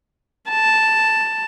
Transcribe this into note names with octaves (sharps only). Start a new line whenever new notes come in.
A5